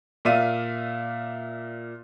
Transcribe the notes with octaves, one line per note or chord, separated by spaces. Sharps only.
A#2 D5 E5 F5 D#7